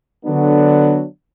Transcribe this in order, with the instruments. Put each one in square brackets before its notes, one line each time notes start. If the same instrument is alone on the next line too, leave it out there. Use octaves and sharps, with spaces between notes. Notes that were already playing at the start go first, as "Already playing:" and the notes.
[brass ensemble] D3 F#3 B3 D4